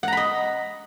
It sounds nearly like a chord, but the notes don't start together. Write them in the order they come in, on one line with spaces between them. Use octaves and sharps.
F#5 A#5 B5 D#5